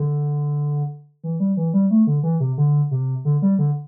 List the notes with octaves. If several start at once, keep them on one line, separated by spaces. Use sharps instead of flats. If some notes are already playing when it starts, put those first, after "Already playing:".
Already playing: D3
E3
G3
E3
G3
A3
D3
E3
C3
D3
C3
D3
G3
D3